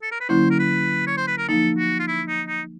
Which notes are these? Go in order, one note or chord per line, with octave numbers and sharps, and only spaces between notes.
A4
A#4
B4
D3 F#3 A#3 C#4 E4 C5
A#4
B4
C#5
C5
B4
A#4
F3 A#3 D#4 A4
F#4
F4
E4
D#4
D#4